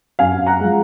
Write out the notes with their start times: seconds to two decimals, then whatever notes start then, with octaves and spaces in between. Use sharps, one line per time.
0.19 F#2 F5 G#5
0.46 F#5 A#5
0.60 F3 G#3